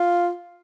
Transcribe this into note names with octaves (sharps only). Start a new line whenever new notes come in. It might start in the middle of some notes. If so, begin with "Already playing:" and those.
Already playing: F4